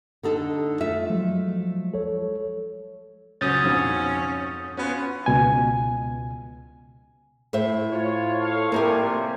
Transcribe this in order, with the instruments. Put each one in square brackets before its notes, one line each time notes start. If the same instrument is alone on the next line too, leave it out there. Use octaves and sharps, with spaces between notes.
[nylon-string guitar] D3 D#4 A4
A3 F4 E5
[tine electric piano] F3 F#3 G#3
A4 C#5
[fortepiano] C#2 F#3 [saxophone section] C#4 [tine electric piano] D#6 G6 A6
[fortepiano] F2 G#2 B2
[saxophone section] B3 F4 F#4 [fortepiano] C#4
[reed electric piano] C#2 B2 G#5
[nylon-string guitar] A2 C5 E5
[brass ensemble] F4 C#5
A4 C#5 F5
[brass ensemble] C3 F3 G3 [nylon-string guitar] A#3 A#4 G#5